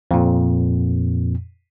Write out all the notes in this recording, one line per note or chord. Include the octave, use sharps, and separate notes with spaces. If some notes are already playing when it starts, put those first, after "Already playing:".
F2 A#2